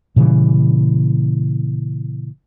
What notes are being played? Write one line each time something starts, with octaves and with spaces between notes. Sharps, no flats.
A#2 C#3 E3 G3